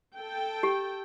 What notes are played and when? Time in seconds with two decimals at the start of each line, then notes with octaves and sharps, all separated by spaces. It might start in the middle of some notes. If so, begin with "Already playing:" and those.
0.17 A4 G5
0.63 G4